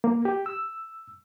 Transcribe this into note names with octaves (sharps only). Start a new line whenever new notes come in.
A#3
G4
E6